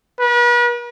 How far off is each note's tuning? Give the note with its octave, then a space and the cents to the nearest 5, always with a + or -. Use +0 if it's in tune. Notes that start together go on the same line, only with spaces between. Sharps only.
B4 -40